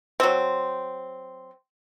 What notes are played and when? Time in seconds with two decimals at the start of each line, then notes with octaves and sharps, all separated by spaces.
0.20 F#3 C4